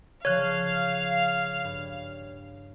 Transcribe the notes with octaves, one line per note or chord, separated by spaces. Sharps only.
C#3 F3 C#5 F5 F#6
G2